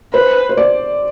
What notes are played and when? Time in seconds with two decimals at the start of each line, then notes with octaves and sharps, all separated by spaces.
0.13 B4 C5
0.49 C5
0.57 D5